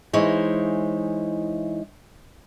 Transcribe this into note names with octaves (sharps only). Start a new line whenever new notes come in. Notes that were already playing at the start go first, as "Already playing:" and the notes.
E3 G#3 D#4 E4 C5 C#5